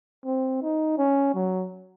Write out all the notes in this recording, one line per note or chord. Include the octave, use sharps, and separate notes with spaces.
C4
D#4
C#4
F#3